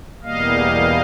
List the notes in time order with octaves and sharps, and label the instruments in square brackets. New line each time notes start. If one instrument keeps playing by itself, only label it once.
[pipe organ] E2 B2 G3 A#3 D#5 F5